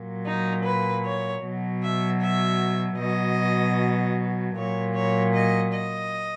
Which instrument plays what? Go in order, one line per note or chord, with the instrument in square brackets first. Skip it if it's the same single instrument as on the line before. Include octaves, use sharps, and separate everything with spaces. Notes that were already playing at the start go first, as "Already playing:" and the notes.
Already playing: [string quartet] A#2 F#3
D#4
B4
C#5
B2 F#3
E5
E5
B2 F#3 D#5
A#2 F#3 C#5
C#5
D#5
D#5